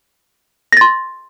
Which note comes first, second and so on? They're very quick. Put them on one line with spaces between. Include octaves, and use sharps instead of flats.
A#6 A6 C6